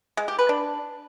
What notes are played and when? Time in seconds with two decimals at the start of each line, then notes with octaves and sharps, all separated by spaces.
0.17 G#3
0.28 G4
0.39 B4
0.49 D4